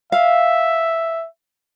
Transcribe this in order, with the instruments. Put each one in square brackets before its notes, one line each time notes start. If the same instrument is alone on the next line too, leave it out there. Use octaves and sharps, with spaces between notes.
[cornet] E5 [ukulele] F5